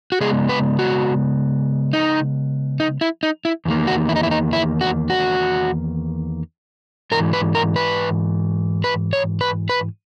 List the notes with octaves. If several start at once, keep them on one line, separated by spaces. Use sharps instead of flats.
F#4
C#3 G#3 B3 G#4
B4
F#4
D#4
D#4
E4
D#4
E4
E2 D#3 A#3
F#4
E4
D#4
E4
D#4
E4
F#4
F#4
G#2 E3 A#4
B4
A#4
B4
B4
C#5
B4
B4